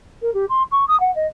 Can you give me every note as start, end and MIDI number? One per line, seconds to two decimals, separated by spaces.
0.22 0.33 70
0.34 0.45 67
0.49 0.63 84
0.72 0.85 85
0.88 0.99 87
1.00 1.13 78
1.15 1.27 75